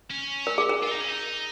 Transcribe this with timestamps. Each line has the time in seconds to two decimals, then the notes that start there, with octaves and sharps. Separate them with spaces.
0.10 C#4
0.47 A#4
0.58 G#4
0.69 A#4
0.83 F4
0.91 D#4
1.01 C#4
1.08 D#4